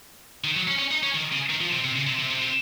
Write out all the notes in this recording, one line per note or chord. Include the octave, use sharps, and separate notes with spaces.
D#3
F#3
C#4
C#4
D#4
C#4
D#3
C#3
D#3
F3
C3
C3
C#3
C3
C3
C3
C3